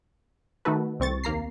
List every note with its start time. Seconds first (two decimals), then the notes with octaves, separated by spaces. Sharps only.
0.65 D#3 A3 D#4 F#4 A4 B4
1.00 C2 C4 C#6 A6
1.24 D#2 A#3 A#5 C7